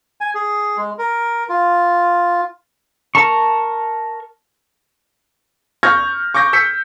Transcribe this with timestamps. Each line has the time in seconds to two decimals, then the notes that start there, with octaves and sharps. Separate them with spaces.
0.21 G#5
0.35 G#4
0.77 G#3
0.99 A#4
1.49 F4
3.15 A#4 A5 A#5 C#6
5.83 C#6 F6 G6 G#6 A#6
6.34 C#6 D6 G6 A#6
6.53 E6 G6 B6 C#7